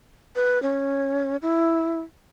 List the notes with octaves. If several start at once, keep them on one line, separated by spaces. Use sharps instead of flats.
B4
C#4
E4